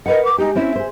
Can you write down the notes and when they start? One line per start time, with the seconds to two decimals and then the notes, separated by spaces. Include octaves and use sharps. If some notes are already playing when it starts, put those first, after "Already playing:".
0.06 A#4 B4 D#5 F#5
0.24 D6
0.38 G#3 D#4 G4
0.55 C4 C#4 E4 E5
0.76 G#4 C5